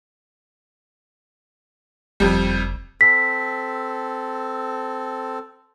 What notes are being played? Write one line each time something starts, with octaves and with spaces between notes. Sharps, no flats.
F#1 F2 G3
C4 A4 B6